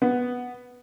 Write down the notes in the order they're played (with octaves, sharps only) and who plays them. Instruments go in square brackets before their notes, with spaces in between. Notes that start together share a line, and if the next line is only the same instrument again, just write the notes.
[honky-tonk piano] B3